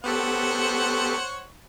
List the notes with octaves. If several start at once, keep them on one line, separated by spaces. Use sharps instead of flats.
B3 G4 A4 C5 C#5 F#5